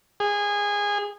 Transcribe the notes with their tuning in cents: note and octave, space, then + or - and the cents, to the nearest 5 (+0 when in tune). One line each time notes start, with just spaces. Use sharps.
G#4 -20